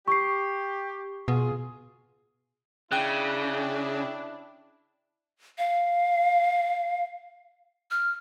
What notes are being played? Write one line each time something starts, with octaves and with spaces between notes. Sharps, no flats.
G4 C#6 C7
B2 F4 G#4
C#3 D4 E4 G5 F#6
F5
F6